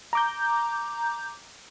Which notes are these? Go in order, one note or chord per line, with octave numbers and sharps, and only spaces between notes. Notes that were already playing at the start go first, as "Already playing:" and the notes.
A#5 D6 G6